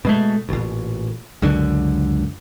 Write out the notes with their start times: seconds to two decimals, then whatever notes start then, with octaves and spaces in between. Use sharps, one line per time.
0.05 B2 G#3 A3
0.49 A1 A#2
1.42 C#2 F#2 D3